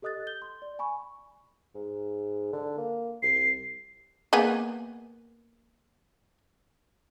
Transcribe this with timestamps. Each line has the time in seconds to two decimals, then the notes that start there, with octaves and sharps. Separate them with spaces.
0.02 G4 A4 D#5 D#6 F#6 A6
0.27 G6 G7
0.42 C6
0.62 D5
0.79 G#5 B5 C#6
1.75 G#2
2.53 D3
2.78 A#3
3.22 C2 C7
4.33 A#3 B3 G#4